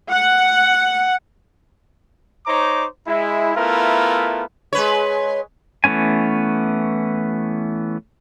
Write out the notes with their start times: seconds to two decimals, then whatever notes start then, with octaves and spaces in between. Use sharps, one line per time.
0.10 F#5
2.47 D#4 C5 C#5 A#5 D6
3.08 G#3 E4
3.56 A3 B3 E4 F4 A#4
4.73 G#3 B4 C#5
5.84 E3 A3 B3 C#4 G#5